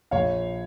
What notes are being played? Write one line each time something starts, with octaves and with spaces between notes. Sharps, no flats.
A#1 C#5 F5